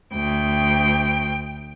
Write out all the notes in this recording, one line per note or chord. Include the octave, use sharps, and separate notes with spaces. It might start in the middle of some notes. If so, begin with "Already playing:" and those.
D2 G5